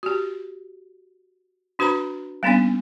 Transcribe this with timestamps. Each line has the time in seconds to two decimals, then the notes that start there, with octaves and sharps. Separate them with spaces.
0.03 F#4 G4
1.79 D4 F#4 B4 C5 A#5 B5
2.43 G3 A#3 B3 C#4 D4 F5